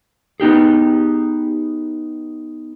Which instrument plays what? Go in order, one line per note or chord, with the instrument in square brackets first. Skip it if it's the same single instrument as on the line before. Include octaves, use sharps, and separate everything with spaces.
[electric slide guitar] B3 D#4 G4 G#4